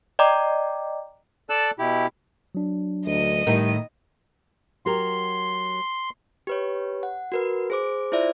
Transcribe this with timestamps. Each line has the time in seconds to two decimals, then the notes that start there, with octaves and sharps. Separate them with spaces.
0.19 D5 D#5 G5 A#5 D6
1.50 A4 D5 A5 E6 F#6
1.79 B2 E4 G4
2.55 F#3 D4
3.06 D2 D#5 D#7
3.47 A2 D#3 G3 D#4
4.86 F#3 G4 A#4 C6
6.47 G4 B4 C#5
7.03 F#5
7.32 F#4 A#4 B4
7.70 G#4 C5 D6
8.12 E4 F4 C5 D5 E5